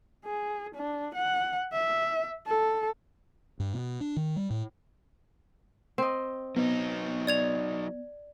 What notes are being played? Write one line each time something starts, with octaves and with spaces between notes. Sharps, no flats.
G#4
D4
F#5
E5
A4
G2
B2
D4
D#3
G3
A2
C4 D#5
F#3 B3 D#4
D5 G#6 F7